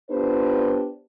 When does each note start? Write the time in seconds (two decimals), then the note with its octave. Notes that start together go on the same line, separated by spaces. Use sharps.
0.11 B3 D4 F4 G4 B4 C5